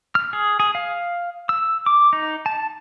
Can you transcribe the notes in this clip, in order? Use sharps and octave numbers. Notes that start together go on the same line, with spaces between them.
F6
G#4
G#4
F5
E6
D6
D#4
A5